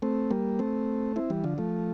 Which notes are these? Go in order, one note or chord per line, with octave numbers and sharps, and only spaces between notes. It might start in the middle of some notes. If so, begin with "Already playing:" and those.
A3 C4
G3 A#3
A3 C4
C4 E4
E3 G3
D3 F3
F3 A3